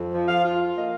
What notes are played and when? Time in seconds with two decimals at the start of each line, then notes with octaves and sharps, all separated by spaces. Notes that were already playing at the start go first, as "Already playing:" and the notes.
Already playing: F2
0.14 F3
0.29 F5
0.45 F4
0.76 A#3 D#5